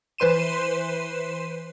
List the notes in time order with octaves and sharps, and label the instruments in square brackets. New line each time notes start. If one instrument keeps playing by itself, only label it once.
[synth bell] E3 B4 C5 C6 D#7 E7